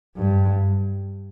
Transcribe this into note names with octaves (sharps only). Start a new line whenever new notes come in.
G2